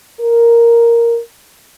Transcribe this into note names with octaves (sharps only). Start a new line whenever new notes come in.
A#4